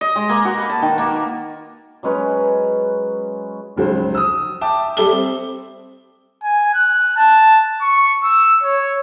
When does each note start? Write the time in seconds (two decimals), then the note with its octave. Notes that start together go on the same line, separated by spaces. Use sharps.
0.01 D#5
0.16 G#3
0.29 A#3
0.45 F#4
0.58 B4
0.69 A5
0.82 D#3
0.98 A#3
2.03 F#3 G#3 C#4 B4
3.76 F1 C#2 F#3 C5
4.15 D#6 E6
4.61 E5 G5 A5 D6
4.97 G3 A4 E5 D6 G7
5.11 C4
6.43 G#5
6.74 F#6
7.17 A5
7.82 C#6
8.24 E6
8.63 C#5